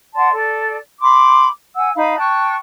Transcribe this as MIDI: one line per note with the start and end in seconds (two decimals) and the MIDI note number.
0.15 0.30 74
0.15 0.30 78
0.15 0.30 81
0.15 0.30 84
0.31 0.75 69
0.31 0.75 74
1.01 1.47 83
1.01 1.47 84
1.01 1.47 86
1.75 1.90 78
1.75 1.90 80
1.75 1.90 88
1.94 2.17 63
1.94 2.17 77
1.94 2.17 83
2.17 2.54 79
2.17 2.54 81
2.17 2.54 85
2.17 2.54 90